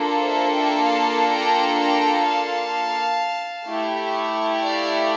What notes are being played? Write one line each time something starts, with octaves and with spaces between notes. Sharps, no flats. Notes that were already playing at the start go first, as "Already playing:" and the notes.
Already playing: A#3 D4 F4 A4
C5 E5
E5 G5
F5 A5
G5 A#5
G5 A#5
F5 A5
A3 E4 G4
D5 F5